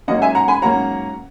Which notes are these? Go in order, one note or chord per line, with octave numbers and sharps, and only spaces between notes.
G#2 F#3 A#3 C#4 D#5 F#5
E5 G#5
F#5 A#5
G#5 B5
G#2 F#3 A#3 C#4 F#5 A#5